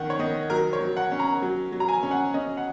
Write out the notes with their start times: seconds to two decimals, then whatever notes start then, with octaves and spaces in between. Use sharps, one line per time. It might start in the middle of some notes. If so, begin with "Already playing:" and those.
Already playing: D#3 C#4 F#5
0.10 C#5
0.19 D#3 D#5
0.50 F#3 A#4
0.73 C#5
0.80 F#3
0.97 F#5
1.12 C#4
1.20 A#5
1.42 F#3
1.72 F#3
1.80 A#5
1.88 G#5
2.03 C#4
2.11 F#5
2.34 C#4 D#5
2.57 F#5